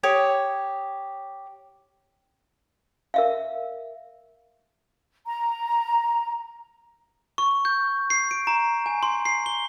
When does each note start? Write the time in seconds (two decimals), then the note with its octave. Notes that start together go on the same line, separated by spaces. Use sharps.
0.03 G4 C#5 D#6
3.14 A#4 E5 F5
5.25 A#5
7.38 C#6
7.65 G6
8.10 C7
8.31 D7
8.47 A#5
8.86 G#5
9.03 C6
9.25 C7
9.46 G7